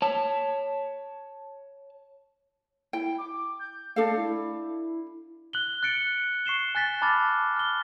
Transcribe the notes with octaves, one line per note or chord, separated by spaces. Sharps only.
C#5 A5
E4 G5
D6
G6
A3 D4 A4 F5
E4
F#6 F#7 G7
F#6 A6 C#7 D7
C#6 C7 E7 G7
G#5 F#6 A6 B6
A5 B5 D6 F6 A6
F6 G7